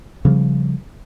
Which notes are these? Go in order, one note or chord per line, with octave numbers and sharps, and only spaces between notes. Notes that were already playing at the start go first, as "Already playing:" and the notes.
C#3 F3 G3